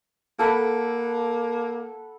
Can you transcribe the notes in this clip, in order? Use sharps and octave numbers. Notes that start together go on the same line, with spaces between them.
A#3 A4 F#5 B5